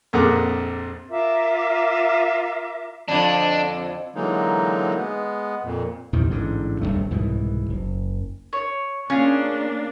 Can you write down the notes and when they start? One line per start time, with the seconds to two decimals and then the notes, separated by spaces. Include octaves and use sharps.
0.13 A#1 F2 G#4 A#4 F#5 D6
1.09 F4 A#4 E5 D6
3.09 F2 D3 D4
4.15 D3 E3 F#3 G#3 A#3 D#4
4.97 G#3 B3
5.63 F2 A#2
6.13 A#1 E2 C3 D#3
6.30 A1 G#2 D3
6.81 D1 E2 G2 A3
7.11 C2 G#2 B2 E3
7.70 F#1
8.53 C#5
9.10 A#3 C#4 D4 F4 G#4